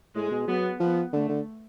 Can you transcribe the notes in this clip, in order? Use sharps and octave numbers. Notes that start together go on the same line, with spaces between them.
A2 G#3
B2
F#3 B3
F3 B3
D3 A3
D3